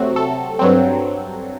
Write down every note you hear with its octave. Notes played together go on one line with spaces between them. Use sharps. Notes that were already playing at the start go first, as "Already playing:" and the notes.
Already playing: C3 F#3 A3 C4 F#4
A4
G2 F#3 C4